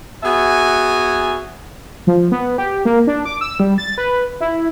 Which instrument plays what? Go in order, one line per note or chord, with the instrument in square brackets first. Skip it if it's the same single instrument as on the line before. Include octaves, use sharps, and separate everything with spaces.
[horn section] B3 F#4 G#4 E5 G#5
[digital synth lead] F3
B3
G4
A#3
D4
D6
E6
G3
A6
B4
E4